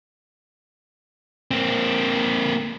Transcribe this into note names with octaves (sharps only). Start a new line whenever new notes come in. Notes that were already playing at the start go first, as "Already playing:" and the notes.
A#3 C4